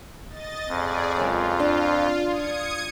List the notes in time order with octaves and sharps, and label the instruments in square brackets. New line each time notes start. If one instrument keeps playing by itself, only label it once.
[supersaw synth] D#5 A6
[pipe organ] F2 [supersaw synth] G#4 D5
[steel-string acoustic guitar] F#2 C#3 G#3 [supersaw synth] F4
[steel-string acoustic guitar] D4
[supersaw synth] D#6 G#6 C#7